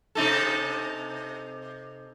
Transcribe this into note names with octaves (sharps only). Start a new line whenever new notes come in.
C3 D#4 A4